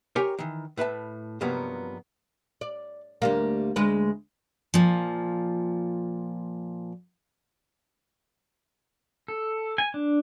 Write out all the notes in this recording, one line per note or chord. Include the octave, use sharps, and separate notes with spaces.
G4 A#4 C5 C#5 G5 G#5
D#3 E3
A2 B4 E5 A5
G2 C3 F3 F#3 A#3 B3
D5
D2 G3 A#3
D2 G#3 B4
A#2 F3
A4
G#5
D4